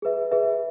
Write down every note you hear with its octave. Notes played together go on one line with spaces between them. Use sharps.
G#4 B4 E5
G#4 B4 E5